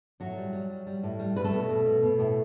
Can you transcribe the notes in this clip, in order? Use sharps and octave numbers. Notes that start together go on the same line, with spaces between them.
A2 F#3 F#4
G3
G3
G3
G3
A2
G3
G3 B4
A3 A4
B2
B2
B2
B2
A2